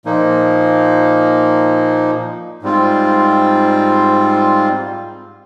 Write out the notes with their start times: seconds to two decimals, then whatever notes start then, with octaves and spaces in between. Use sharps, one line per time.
0.05 A#2 F3 A#3 D#4
2.62 G#2 G3 C4 F4